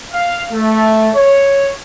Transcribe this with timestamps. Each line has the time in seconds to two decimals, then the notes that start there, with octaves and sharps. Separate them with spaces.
0.12 F5
0.52 A3
1.14 C#5